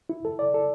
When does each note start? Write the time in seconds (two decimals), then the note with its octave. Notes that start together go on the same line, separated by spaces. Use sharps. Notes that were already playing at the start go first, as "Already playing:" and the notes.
0.10 E4
0.25 A4
0.39 D5
0.54 A4